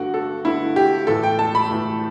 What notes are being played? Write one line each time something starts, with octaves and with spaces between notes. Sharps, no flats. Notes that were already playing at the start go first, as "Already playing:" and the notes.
Already playing: G2 D3 A3 F#4
A4
G2 D3 A3 E4
G4
A2 E3 A3 A4
G5
A5
B5
A2 E3 A3